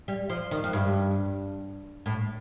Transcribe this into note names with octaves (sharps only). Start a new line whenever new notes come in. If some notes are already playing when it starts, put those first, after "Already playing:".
G3
F3
D#3
F2
G2
A2